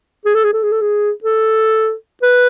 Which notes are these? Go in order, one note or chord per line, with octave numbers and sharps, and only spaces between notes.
G#4
A4
G#4
A4
G#4
A4
G#4
A4
B4